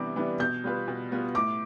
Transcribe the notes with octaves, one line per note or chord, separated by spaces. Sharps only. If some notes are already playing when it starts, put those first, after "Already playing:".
Already playing: C3 E3 G3 B3 D4 D6
E3 G3 B3 D4
B2 G6
G3 B3 F4 B4
B2
G3 B3 F4 B4
A2 D6